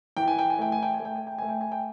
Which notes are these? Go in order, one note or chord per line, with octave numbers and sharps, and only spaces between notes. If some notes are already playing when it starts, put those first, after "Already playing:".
E3 G5
G#5
G5
G#5
A3 G5
G#5
G5
G#5
A3
G5
G#5
G5
A3 G#5
G5
G#5
G5